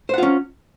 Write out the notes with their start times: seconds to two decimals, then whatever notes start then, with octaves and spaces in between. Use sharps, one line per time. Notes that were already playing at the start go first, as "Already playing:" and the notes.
0.09 C5
0.14 F#5
0.18 F4
0.23 C#4